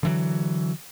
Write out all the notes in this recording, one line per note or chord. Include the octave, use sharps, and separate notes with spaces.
D3 E3 F#3